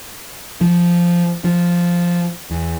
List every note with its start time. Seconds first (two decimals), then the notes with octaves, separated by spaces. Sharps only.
0.61 F3
1.44 F3
2.51 E2